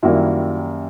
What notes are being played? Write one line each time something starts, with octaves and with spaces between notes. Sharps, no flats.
F#2 D#3 G3 A#3 E4 F#4